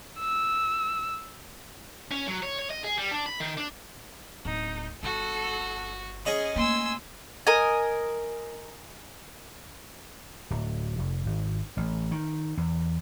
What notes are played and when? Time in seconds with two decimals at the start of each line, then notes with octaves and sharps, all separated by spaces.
0.20 E6
2.11 C#4
2.27 F#3
2.42 C#5
2.59 C#5
2.70 D#5
2.84 G#4
2.98 G3
3.11 D4
3.26 B5
3.40 D#3
3.58 D4
4.45 D1 D#4
5.03 G1 F#4 A4 F#5
6.26 C#4 G#4 D#5 B5
6.56 A3 A#3 G#5 C6 E6
7.47 A#4 D#5 G#5
10.50 D1
10.99 F1
11.26 G#1
11.77 A1
12.11 D#3
12.57 E2